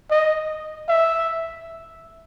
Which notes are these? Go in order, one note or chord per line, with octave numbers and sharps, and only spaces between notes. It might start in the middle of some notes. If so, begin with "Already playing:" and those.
D#5
E5